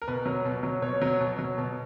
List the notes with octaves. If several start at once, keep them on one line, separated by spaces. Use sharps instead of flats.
A#4
B2 B4
F#3
B2
F#3
B2 C#5
F#3
B2
F#3
B2